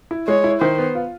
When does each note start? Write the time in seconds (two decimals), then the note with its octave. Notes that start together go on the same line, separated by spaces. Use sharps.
0.11 E4
0.28 G#3 C#5
0.44 E4
0.61 D#3 C5
0.78 B3
0.95 F4